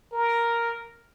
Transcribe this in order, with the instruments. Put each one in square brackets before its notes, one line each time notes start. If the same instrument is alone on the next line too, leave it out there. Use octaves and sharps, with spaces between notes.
[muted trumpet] A#4